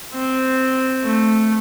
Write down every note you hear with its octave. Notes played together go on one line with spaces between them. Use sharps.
C4
A3